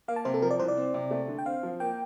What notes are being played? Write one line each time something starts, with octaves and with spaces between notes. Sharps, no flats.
A#3 F5
A5
C3 C5
A4
F3 A#4
D5
C2 C5
D5
C4
C3
A3
D3
G5
C4 F5
F3
A#3 G5